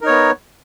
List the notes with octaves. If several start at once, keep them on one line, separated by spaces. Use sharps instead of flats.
B3 D#4 A#4 C#5